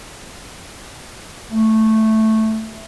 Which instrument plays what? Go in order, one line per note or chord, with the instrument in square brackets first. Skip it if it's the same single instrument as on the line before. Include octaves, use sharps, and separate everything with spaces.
[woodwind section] A3